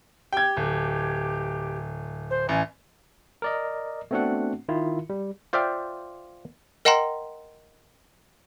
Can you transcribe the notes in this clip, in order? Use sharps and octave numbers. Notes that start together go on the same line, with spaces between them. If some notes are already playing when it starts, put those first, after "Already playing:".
G4 G5 G#6
D1
C5
A1 G#5
A#4 D5 D#5
A3 B3 C4 D4 F#4 F#5
D#3 E4 F4
G3
F4 C5 D5 E5 F5 G5
A#4 D#5 F#5 G5 A#5 C6